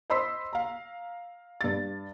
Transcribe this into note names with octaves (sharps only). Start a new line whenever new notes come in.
C5 D#5 B5 C6 E6 B6
F5 A#5
G2 A6